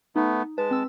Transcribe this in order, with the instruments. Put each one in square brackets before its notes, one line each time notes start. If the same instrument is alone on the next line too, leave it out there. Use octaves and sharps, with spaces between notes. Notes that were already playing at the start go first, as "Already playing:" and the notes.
[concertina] A3 B3 [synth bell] D#4
[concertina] G#3 A5 [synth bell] B4
[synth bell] C4 E6